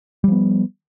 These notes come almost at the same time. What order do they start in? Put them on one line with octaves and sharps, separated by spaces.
G3 F3 B3